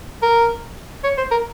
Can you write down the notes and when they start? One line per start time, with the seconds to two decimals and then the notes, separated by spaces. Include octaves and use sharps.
0.23 A#4
1.04 C#5
1.18 C5
1.32 A#4